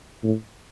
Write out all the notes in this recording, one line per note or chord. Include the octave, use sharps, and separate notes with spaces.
A2